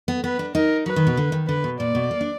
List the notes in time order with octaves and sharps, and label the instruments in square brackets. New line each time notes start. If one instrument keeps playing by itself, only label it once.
[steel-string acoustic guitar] B3
[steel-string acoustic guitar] B3 [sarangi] B4
[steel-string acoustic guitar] D4
[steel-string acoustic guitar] D#4 [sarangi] A#4
[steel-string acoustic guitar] F#3 [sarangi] B4
[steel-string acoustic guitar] D#3
B2
D3
D#3
[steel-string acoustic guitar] D3 [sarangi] B4
[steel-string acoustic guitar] B2
[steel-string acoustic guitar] A#2 [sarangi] D5
[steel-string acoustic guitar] B2
A#3
D4